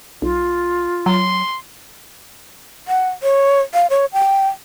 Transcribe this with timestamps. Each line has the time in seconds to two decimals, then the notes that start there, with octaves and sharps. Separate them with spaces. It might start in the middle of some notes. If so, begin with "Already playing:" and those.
0.22 B1 F4
1.06 F#3 C6
2.88 F#5
3.23 C#5
3.74 F5
3.90 C#5
4.13 G5